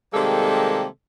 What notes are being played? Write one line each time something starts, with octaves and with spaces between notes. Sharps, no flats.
C3 D#3 G3 G#3 A#3 A4